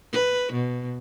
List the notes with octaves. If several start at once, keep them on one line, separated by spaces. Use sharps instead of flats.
B4
B2